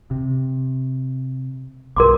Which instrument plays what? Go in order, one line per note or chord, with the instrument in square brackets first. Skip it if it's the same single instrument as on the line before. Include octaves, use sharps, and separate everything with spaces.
[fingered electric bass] C3
[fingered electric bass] B1 G2 [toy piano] A#4 C6 D6